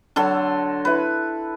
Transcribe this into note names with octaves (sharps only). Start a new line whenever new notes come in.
D3 F#3 A4 C6
E4 B4